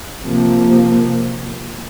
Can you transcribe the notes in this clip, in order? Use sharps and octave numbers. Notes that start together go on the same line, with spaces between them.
C3 F3 A#3